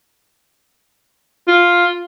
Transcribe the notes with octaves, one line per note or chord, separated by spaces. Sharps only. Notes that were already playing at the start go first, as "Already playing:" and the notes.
F4